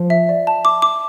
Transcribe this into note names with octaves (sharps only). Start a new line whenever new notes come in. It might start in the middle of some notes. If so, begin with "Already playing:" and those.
Already playing: F3
E5
D5
A5
D6
D6